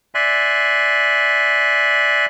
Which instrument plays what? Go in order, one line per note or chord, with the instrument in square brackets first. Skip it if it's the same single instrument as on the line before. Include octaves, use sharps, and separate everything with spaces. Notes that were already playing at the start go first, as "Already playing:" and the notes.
[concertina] D5 E5 G#5 C6 F#6